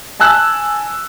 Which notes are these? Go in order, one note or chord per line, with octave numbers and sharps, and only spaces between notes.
G#5 A5 E6 F#6